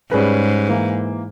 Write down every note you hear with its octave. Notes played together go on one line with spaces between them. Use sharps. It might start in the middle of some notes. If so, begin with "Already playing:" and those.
G#2 G3 C#4 G#4 B4
E3 A#3